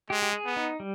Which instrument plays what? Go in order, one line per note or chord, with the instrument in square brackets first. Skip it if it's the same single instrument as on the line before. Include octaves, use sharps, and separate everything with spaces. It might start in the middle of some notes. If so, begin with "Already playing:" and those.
[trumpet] G#3 [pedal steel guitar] G4
[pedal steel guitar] G4
G#4
[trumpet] B3
[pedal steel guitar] D#4
G3